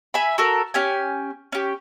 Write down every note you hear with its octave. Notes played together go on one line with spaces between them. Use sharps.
E5 G#5 B5
F#4 A4 A#4
C#4 G4 G#5
C#4 G4